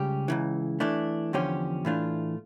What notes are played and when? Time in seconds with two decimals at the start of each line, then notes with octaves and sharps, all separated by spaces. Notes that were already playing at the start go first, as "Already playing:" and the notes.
Already playing: C#2 C#3 G3 C#4 G4
0.28 C#2 C#3 E3
0.80 E3 A3 D4
1.33 E2 D3 F3 C#4 G4
1.85 A2 E3 A3 D4 F4